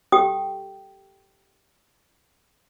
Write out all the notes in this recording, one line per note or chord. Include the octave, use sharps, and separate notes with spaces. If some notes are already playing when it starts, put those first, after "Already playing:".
G4 A4 G5 D#6